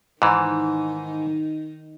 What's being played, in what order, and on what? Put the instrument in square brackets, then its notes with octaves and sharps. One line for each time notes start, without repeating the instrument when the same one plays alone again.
[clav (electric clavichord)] G#2 E3 [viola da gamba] D#3 D#4